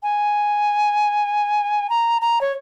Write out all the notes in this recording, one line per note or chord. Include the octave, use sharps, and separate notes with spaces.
G#5
A#5
A#5
C#5